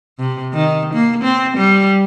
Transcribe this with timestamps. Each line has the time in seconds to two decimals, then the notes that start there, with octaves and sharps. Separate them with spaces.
0.19 C3
0.53 D#3
0.94 A#3
1.24 C4
1.57 G3